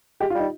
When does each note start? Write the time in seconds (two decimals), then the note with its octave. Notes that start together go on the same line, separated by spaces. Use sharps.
0.20 G#3 G4
0.30 F4
0.35 G3 D#4